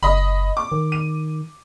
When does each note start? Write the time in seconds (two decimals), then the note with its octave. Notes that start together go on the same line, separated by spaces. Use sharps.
0.03 F#1 D#5 B5
0.57 D6
0.72 D#3
0.92 D#7